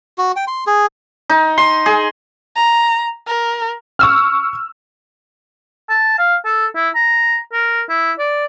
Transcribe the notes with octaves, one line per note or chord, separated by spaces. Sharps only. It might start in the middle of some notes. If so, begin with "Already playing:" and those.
F#4
G5
C6
G#4
D#4
C6
G#4
A#5
A#4
C#6 E6 F6
A5
F5
A4
E4
A#5
A#4
E4
D5